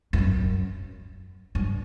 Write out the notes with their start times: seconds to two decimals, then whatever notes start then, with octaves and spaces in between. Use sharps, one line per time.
0.13 E2
0.18 F#2
1.55 G2